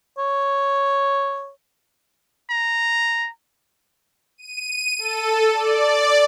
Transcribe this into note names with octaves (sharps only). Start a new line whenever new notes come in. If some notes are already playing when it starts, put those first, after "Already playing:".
C#5
A#5
D#7
A4
D5